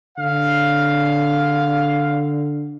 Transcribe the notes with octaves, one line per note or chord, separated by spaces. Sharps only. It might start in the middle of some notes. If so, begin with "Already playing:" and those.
D3 F5